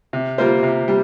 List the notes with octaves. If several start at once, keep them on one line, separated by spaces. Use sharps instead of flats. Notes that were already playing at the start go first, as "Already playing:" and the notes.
C3
G3 A#3 F4 C5
C3
G3